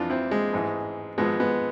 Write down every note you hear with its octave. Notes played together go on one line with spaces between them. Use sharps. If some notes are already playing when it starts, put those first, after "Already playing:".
Already playing: F2 E3 D4 F4
C4 E4
G#3
A1 G#2 E3
G#1 G#2 F3 G#3 B3
G#3 B3